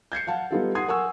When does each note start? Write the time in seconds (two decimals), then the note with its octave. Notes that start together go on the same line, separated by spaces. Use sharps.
0.12 G6 G#6 C7 C#7
0.27 F5 F#5 A5
0.51 G3 B3 D#4 F4 G4 A4
0.75 F#5 C6 D#6 G#6 C7
0.88 A#4 F#5 G#5 C#6 E6